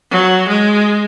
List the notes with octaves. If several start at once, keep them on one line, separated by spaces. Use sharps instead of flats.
F#3
G#3